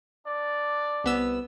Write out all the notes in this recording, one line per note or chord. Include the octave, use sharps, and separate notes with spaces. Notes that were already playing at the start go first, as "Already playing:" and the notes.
D4 D5
C2 B3 E6